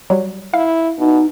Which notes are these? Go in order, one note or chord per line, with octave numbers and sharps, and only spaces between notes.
F#3 G3
E4 F5
B2 D#4